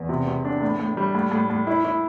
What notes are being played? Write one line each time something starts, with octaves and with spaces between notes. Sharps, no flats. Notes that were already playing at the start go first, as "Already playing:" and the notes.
Already playing: E2
C3
C3
D4
A2
A2
G3
A2
A2
A2
E4
E4